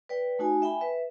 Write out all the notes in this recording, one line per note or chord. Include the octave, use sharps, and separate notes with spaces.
B4 D5 G5
A3 D#4 F#4 G#5
E5 G5 G#5 B5
B4 E5